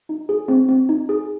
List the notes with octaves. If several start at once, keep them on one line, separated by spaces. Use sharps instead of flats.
D#4
G#4
C4
C4
D#4
G#4